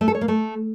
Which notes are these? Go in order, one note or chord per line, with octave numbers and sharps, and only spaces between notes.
A3
A4
C#5
A#3
A3